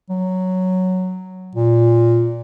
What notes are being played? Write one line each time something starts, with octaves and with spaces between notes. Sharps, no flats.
F#3
A#2